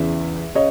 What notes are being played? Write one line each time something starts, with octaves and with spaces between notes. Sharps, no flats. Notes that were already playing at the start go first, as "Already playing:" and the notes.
Already playing: E2 C#3 E3 E5
C#3 C#5 D#5